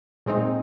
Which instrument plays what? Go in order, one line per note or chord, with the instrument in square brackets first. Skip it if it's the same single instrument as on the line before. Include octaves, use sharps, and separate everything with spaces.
[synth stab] A#2 G#3 C4 D#4